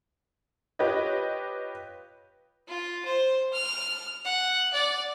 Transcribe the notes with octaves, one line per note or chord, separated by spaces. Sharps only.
F4 G4 B4 C#5 D#5
F4
C5
F6
F#5
D5